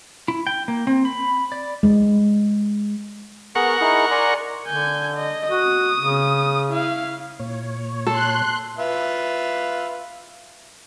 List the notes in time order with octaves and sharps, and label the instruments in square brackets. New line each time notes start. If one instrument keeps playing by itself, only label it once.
[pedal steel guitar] E4
G5
A#3
C4
B5
D5
[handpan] G#3
[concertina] B3 G#4 [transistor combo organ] A#4 F#5 C#6
[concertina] D#4 E4 G#4
D5 G#5 C6
[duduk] D3 [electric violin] G#5 G6
[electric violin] D#5
[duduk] F#4 [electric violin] D#6
[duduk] C#3
[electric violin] E4 F5
[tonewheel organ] A#2 C#5
[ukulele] A4 [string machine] C6 F#6
[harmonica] F4 B4 E5